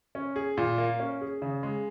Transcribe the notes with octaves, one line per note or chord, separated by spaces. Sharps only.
C#4
G#4
A#2
A#3
C#4
G#4
C#3
G#3